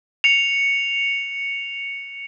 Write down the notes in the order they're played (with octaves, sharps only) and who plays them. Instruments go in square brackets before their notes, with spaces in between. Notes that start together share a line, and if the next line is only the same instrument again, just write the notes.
[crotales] C#7 F7